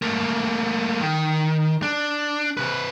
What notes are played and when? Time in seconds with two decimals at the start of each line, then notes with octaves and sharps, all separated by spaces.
0.02 A3 A#3
1.01 D#3
1.82 D4
2.57 C3 B4